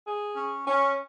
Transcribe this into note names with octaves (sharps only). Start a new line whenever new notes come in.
G#4
C#4
C#4